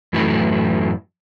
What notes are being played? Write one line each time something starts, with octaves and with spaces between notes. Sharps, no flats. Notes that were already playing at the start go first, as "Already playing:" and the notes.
F#2 A2 E3 F#3 A3 E4